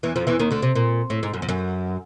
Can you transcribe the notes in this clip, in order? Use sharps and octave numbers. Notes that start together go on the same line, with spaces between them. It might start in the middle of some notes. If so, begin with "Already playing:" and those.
E2 E3
F2 F3
E2 E3
D#2 D#3
D2 D3
C3
A#2
A2
G#2
F#2
F2
F#2